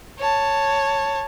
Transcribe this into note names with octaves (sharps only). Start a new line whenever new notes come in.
C#5 A5